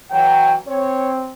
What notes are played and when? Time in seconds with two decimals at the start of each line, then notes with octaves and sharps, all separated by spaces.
0.11 E3 F#3 G5
0.67 C4 C#5